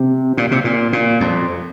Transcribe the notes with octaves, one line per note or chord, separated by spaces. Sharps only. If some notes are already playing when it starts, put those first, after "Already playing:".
Already playing: C3
A#2
C3
A#2
A#2
F2